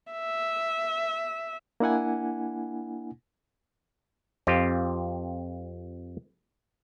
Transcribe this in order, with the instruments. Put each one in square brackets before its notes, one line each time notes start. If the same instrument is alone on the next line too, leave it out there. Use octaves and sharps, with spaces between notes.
[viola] E5
[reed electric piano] A#3 D4 E4 F#5 G#5
[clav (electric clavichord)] F2 C4 F4 G4